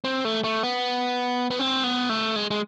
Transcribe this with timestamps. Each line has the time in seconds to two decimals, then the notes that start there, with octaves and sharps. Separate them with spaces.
0.04 C4
0.25 A3
0.44 A3
0.63 B3
1.51 B3
1.59 C4
1.84 B3
2.09 A3
2.36 G#3
2.51 G#3